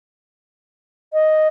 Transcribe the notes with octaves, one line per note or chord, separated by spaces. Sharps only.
D#5